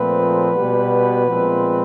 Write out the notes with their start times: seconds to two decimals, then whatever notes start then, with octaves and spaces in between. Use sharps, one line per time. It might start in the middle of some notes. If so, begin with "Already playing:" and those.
Already playing: A#2 F3 A3 C4 B4
0.53 B2 G3 B3
1.27 A#2 F3 G#3 C4